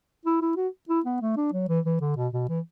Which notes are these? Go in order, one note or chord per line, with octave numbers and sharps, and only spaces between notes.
E4
E4
F#4
E4
B3
A3
D4
F#3
E3
E3
D3
B2
B2
E3